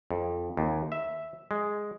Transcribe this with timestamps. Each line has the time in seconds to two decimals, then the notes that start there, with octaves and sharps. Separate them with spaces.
0.11 F2
0.57 D#2
0.92 E5
1.51 G#3